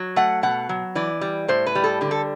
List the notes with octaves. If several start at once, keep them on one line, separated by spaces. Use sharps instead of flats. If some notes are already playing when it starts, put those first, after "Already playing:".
Already playing: F#3
A3 F#5
B2 F#5
F#3
E3 D5
G3
A2 C5
B4
G3
A4
D3 G4
A4